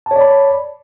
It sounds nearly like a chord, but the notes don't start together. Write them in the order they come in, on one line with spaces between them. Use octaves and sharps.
A5 C#5 D5 B5